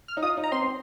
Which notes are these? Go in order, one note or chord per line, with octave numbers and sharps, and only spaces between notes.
F6
D#4
F4 D#6
D#4
A#5
C4 C6
C4